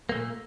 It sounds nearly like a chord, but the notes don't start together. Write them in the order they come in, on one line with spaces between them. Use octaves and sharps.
A#3 A3 A#2